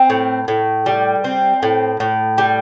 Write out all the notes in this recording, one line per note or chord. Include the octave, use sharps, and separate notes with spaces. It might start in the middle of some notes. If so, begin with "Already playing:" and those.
Already playing: C4
A2
A2
G3
C4
A2
A2
G3